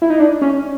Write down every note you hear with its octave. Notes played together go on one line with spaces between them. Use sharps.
E4
D#4
D4
C#4